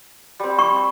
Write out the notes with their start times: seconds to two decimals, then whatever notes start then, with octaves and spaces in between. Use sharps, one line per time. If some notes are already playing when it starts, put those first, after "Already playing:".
0.40 G3 C4
0.59 C#6